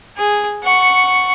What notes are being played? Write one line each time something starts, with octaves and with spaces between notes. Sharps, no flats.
G#4
F#5 C#6